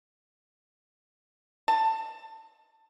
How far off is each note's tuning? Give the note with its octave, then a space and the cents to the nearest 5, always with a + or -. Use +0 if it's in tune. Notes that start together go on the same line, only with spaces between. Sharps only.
A5 +15